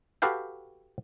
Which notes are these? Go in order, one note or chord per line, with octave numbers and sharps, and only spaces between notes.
F#4 G4 A4 B4 F5 G5